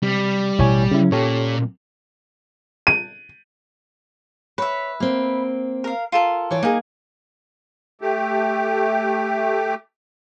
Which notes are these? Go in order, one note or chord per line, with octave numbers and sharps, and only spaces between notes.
C3 G3
A1 B2 E4 C#5 G#5
C#3 C#4 E4
A#2 G4 A4 C#5
D#7
B4 C#5 E5
A#3 C4
A#4 F5
F4 A4 A#4
E3 C#5 D5
A#3 D#4 G#4
A3 G4